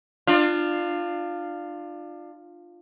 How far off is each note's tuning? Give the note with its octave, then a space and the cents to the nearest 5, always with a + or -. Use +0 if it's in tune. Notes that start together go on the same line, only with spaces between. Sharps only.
D4 +30 F4 +0